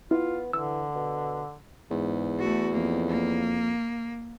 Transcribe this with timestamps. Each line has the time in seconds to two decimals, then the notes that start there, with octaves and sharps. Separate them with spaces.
0.11 B3 E4 F4
0.53 D3 E3 E6
0.95 B2
1.91 E2 G#2
2.39 A3 F#4
2.73 F2 A#3
3.08 A#3